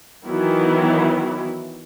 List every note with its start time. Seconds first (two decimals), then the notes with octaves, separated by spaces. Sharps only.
0.26 D#3 E3 F#3 B3 E4